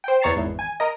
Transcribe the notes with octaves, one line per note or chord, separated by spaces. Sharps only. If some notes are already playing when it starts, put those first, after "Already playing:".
C5 G5
E2 C#5 A#5 A6 C7 E7
G#1 E2
G#5
A#4 D#5